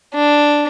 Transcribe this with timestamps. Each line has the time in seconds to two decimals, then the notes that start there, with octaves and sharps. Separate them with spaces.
0.14 D4